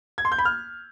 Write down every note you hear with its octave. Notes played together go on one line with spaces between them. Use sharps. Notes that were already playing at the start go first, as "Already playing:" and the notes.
G#6
C6
G6
B5
F6